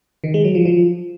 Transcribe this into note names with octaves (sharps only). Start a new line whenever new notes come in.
D#3
G#3
F#3
F3
F3